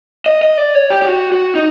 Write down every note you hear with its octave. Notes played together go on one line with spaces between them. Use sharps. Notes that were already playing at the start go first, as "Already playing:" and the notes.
D#5
D#5
D5
C#5
G4
G4
F#4
F#4
D#4